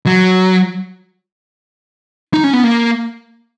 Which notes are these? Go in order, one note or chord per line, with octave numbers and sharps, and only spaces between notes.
F#3
D#4
C#4
B3
A#3